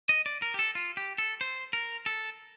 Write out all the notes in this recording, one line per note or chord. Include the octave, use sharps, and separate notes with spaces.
D#5
D5
A#4
G4
A4
F4
G4
A4
C5
A#4
A4